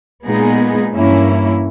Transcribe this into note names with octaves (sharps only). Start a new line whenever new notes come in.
A#2 G#3 B3 D#4 G#4
G2 E3 A#3 C#4 E4